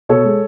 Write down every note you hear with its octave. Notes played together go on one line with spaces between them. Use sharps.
B2 A4 C#5
G#3